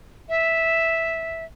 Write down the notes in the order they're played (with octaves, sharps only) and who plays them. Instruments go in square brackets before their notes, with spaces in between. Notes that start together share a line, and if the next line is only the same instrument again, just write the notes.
[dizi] E5